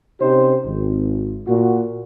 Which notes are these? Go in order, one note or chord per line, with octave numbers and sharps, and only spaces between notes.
C3 C#4 D#4 G4 C5
G#1
A#2 F#4